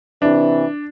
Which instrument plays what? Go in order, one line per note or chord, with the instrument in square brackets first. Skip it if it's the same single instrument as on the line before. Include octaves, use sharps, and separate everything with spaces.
[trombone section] C3 E3 [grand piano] D4